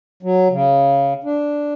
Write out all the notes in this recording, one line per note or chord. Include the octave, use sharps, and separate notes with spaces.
F#3
C#3
D4